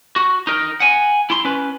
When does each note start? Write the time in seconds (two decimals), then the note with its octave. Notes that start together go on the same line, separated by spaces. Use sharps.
0.16 F#4
0.47 D#4 A#4
0.80 F#5 G#5
1.30 E4 C6
1.45 C#4 B4